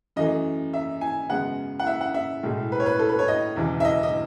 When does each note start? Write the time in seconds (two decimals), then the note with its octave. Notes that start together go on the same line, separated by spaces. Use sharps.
0.16 F#2 E3 A3 D#5
0.73 E5
1.01 G#5
1.29 F#2 C#3 G#3 B3 F#5
1.80 F#5
1.87 E5
2.01 F#5
2.14 E5
2.43 B1 A2 G#3
2.72 B4
2.80 C#5
2.86 B4
2.99 A4
3.09 B4
3.19 C#5
3.28 D#5
3.56 E1 E2 C#3 E3
3.80 E5
3.85 D#5
4.03 D#5